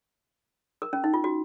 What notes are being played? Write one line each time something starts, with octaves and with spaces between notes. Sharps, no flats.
A#4
C#4
D#4
F4
F#4